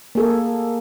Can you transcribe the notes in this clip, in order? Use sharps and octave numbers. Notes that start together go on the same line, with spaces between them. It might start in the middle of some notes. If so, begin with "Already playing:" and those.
A#3 G#4 A4